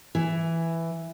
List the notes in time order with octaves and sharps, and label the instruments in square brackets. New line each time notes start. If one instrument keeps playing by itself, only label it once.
[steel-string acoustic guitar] E3